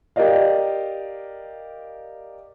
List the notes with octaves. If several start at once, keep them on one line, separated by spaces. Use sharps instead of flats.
G4 A#4 D5 D#5 F5